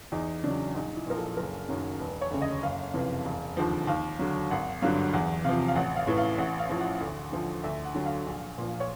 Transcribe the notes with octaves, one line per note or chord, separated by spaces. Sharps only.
E2 D#4
C#3 F#3 D4
A#1 D#4
E4
A#2 F3 A#4
A4
F#1 A#4
F#2 D#3 F#3
E1 B4
C#5
D2 C#3
D#5
F#1 F5
F2 C3 E3
E1
D#2 D3 F3
D#2 F5
D3 F#3
G#1 F#5
G2 D3 F#3 F5
E2 F#5
C3 F3 F5
F5
A1 F#5
F5
A2 E3
F5
A1 F#5
F5
A2 F3
F#5
D2
D3 F3
D2 E5
F#5
D3 F#3
F5
A#1
A#2 F3
C#5